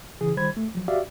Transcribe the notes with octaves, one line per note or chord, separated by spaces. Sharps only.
C#3 E3 G#4
D#3 G3 C5 B5 G#6
A3
F3 F#3
F#4 G4 D5 E5 F5